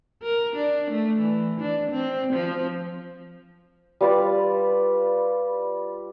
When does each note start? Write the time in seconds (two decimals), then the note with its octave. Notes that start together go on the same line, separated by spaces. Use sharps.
0.22 A#4
0.56 D4
0.90 A3
1.20 E3
1.60 D4
1.91 C4
2.33 F3
4.01 G3 F4 B4 D5